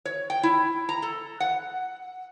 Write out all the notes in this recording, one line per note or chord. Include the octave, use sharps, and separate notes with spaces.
C#5
G5
E4
A#5
A4
F#5